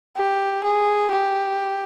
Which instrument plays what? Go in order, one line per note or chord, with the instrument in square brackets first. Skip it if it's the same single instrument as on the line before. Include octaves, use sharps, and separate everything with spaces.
[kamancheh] G4
G#4
G4